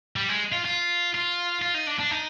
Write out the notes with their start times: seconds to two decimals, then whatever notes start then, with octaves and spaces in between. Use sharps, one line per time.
0.16 G3
0.29 G#3
0.52 F4
0.65 F4
1.14 F4
1.62 F4
1.74 D#4
1.87 D4
1.99 D4
2.11 D#4